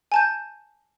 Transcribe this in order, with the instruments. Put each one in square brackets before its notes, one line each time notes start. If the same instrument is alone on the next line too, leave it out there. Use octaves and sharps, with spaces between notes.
[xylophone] G#5 A5 G6